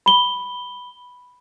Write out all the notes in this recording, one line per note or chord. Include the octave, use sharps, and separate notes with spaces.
B5 G7